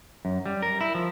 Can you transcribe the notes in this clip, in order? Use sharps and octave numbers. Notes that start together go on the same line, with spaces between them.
F#2
G3
A#4
E4
F3